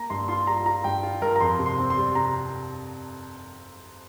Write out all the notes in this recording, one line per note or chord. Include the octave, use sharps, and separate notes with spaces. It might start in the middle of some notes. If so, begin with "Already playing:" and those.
Already playing: A#3 A#5
G2 C6
F4 C6
G3 A#5
F4 A#5
G2 G5
F4
G2 A#4
A#5
F2 C6
C3
C6
C4
C6
G3
C3 A#5